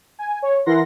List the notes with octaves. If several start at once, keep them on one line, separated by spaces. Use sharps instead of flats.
G#5
C#5
E3 E4 A#4 F#5 C6 A#6